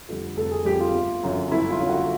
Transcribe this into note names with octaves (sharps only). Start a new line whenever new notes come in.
F2 D3 G3
F1 A4
G#4
F2 D3 G3 G4
F4
G1
F#2 D3 F#3
G1 E4
F4
F#2 D3 F#3
F#4